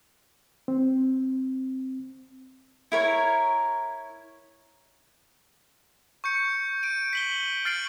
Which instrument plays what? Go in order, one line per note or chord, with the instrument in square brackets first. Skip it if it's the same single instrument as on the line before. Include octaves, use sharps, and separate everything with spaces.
[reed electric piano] C4
[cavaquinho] E4 A#4 C#5
[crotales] C#6 G6 C#7
D7 D#7
B6 F#7 G7
F6 A6 C7 D7 F#7